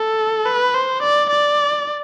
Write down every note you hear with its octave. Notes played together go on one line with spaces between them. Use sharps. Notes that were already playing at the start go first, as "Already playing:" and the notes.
Already playing: A4
B4
C5
D5
D5